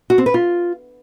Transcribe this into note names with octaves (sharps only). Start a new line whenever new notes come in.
F#4
C4
B4
F4